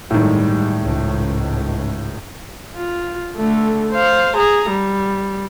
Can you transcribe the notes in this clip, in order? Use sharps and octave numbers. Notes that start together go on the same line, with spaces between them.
G1 A2 D#3 G3 G#3
C#2 G#2
F4
D3 A3
C5 F5
G#4 A#5
G3